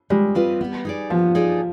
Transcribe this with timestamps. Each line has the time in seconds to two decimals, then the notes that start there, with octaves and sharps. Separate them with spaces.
0.10 G3 G#3
0.35 C4 F4 B4 D#5
0.61 B3
0.85 D#4 G#4 D5
1.10 F3 B3
1.35 D#4 G#4 D5